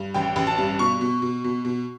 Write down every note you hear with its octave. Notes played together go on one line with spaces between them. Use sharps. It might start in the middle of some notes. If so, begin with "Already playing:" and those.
Already playing: G2
A1 G5
A1
A5
G2
B2 C#6
B2
B2
B2
B2